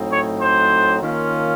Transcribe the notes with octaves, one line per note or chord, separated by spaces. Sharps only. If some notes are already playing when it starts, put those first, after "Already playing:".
Already playing: A2 F#3 C4 D#4
C#5
C5
D#3 A#3 C#4 F4